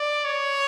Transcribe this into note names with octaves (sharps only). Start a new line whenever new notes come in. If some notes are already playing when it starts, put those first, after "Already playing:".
Already playing: D5
C#5